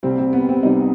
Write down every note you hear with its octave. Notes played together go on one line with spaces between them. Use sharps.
C2 C3 G3 C4
C4
B3
C4
C2 C3 G3 D#4